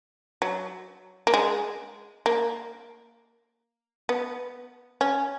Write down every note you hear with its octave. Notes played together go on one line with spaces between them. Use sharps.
F#3
A#3
G#3
A#3
B3
C#4